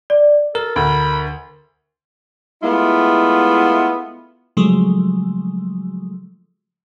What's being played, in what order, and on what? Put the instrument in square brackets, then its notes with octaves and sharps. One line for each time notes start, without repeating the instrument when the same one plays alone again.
[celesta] D5
[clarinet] A4 [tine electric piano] A#4
[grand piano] D2 [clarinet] B5
[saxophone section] G#3 A3 B3 E4 F4
[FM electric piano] C#3 F3 F#3 G#3 A3